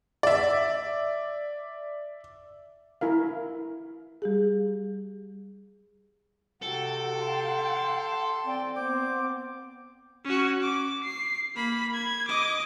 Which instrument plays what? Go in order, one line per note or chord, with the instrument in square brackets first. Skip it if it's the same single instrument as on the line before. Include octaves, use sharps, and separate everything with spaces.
[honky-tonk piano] D5 E5
[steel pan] E4 A#4 F5
[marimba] G3 G4 G#4
[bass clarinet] C3 [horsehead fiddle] F#4 G5 [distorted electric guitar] A4
[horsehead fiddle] F5 G5 [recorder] C6
[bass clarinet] C4 [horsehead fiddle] D5 G5
[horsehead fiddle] B3 C4 [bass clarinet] C5 [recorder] D6
[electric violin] C#4 F#4
D6
C7
A#3 B5
G#6
D#5 D6